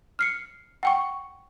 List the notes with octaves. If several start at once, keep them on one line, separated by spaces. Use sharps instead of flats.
F6 C7 C#7
F#5 G5 C#6